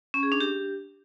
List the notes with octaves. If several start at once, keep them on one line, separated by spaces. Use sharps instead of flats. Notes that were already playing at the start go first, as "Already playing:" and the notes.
C#4
G#4
D4
G4